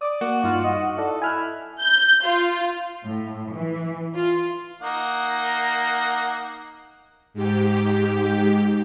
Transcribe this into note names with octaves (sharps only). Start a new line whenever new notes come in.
D5 D6 D#6
A#3 F#4
G2 D#4 F4
D#5
E4 A4 D5 D#5
E4 G#5 F6 F#6
G6
F4
A2
E3
F4
A#3 D#4 F#5
G#2 G4